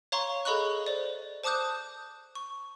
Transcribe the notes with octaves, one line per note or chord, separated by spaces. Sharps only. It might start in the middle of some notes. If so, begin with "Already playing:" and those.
C#5 F5 A#5 C6 C#6
G#4 A4 D#5 B5 C#6 F#6
C5 D5
C5 A5 D6 D#6 F#6 G6
C#6